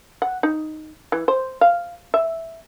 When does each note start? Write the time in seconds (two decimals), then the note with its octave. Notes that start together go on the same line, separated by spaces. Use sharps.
0.22 F#5
0.43 D#4
1.12 E3
1.28 C5
1.61 F5
2.14 E5